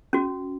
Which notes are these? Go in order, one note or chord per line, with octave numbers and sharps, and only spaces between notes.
C#4 F#4